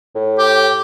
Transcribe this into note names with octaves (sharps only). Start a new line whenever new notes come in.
A2
G4